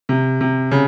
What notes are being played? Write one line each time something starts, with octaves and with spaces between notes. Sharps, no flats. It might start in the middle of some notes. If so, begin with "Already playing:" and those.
C3
C3
C#3